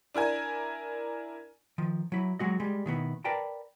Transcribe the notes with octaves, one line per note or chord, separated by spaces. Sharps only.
D4 E4 A#4 G#5
D#3 F3
F#3 E4
F#3 G#3 F#4 D#5
G3 G#3
B2 D#3 B3 E4
A#4 B4 D5 G5 A5 A#5